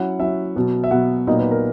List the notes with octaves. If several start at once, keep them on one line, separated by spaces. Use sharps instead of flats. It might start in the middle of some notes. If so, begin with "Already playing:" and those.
Already playing: F#3 C#4 E4 F#5
F#3 C#4 E4 E5
B2 F#3 B3
E5
B2 F#3 B3 F#5
A#2 F#3 B3 D#4 D#5
B4
A#4